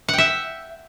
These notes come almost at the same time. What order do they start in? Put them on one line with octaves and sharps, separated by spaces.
F#5 G5 E5